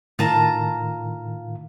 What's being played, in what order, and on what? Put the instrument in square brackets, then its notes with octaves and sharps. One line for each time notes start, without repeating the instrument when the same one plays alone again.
[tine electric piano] A2 D#3 [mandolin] F4 A5 A#5